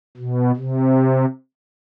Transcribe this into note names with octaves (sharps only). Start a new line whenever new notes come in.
B2
C3